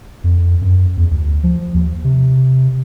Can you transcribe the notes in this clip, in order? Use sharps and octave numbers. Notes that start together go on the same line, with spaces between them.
F2
F#2
E2
D2
F3
D#2
C3